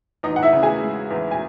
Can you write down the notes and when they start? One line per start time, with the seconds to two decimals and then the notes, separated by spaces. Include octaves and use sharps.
0.23 E2 D#4 D#5
0.36 F#5
0.43 E4 E5
0.53 C#3
0.63 G#4 G#5
0.82 G#3
1.10 E2
1.31 G#5